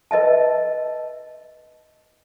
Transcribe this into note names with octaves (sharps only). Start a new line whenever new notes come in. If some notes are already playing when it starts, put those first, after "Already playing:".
B4 D#5 E5 A5